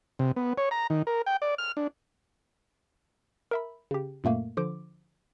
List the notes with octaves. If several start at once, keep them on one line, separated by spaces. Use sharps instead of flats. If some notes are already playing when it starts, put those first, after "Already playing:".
C3
B3
C#5
A#5
D#3
A#4
G5
D5
F6
D4
A#4 E5 B5
C#3 G4
F#2 A#2 A3 A#3
D3 F3 C5 D6